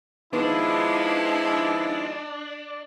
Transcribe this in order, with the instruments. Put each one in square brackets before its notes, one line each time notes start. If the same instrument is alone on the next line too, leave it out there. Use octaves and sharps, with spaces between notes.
[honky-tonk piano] D#3 B3 [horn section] F3 G#3 [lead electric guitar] D4 [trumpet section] E4